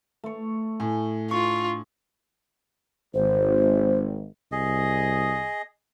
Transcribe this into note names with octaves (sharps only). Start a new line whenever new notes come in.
A3 C#5
A2 G#5
D4 F4 C#6
G#1 C5
C2 G#4 D#5